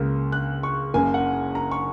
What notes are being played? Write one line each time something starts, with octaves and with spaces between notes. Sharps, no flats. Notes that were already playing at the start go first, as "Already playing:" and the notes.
Already playing: C#2 C#3 A#3
F#6
C#6
F#1 F#2 C#3 A#3 G#5
F#5
A#5
C#6